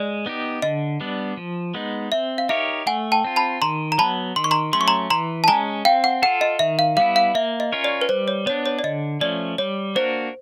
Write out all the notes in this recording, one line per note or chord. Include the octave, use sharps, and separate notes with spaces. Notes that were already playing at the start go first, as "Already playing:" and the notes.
Already playing: G#3 D5
B3 D#4 G4
D3 D#5
G3 B3 D4
F3
G#3 B3 D#4
C4 E5
F5
D#4 G4 A#4 C#5 E5
A3 F#5 G#5
G5 A5
C4 F4
A5 B5
D#3 A#5 C6
A#5
F#3 B3 A5 B5
D#3 C6
C#6
A#5 C6
F#3 A3 C#4 C6
C#6
A#5 C6
E3 A#5 C6
A5
G#3 C#4 G#5 A#5
C4 F5 G5
F#5
F4 A4 F#5
D#5
D#3 E5
F5
G3 B3 E4 F5
F5
A#3 E5
D#5
C#4 F4 A#4 C#5
D5
B4
G3 C5
C#5
B3 D4 C#5
C#5
D5
D3 D#5
F3 A3 C#4 D5
G3 C#5
A#3 D4 F#4 A#4 C5